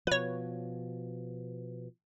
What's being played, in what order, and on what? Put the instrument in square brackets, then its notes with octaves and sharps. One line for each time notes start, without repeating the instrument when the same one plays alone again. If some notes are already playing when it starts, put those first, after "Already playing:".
[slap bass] B2 F3 [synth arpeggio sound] B4 C#5